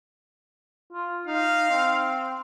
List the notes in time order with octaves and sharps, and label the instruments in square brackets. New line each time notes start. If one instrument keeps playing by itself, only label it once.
[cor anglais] F4
[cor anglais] D#4 [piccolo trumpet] F5
[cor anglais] C4